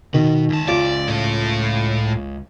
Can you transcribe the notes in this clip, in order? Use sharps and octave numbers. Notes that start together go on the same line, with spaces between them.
B2 D#3 F#4
C#2 A5
F4 D5
A2 A4